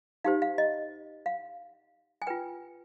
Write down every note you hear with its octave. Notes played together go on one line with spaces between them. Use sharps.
D#4 G4 C5 F5
F5
D#5
F5
G#5
F4 B4 G5